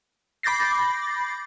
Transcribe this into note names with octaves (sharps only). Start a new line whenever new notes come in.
B5 D6 G6 A6 A#6 C7